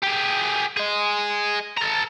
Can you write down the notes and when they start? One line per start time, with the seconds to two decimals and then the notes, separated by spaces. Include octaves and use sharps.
0.03 G4 G#4
0.77 G#4 D#5
1.77 A4 A#5